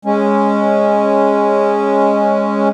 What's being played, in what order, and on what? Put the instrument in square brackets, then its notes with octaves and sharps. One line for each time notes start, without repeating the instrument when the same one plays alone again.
[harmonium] G#3 C#4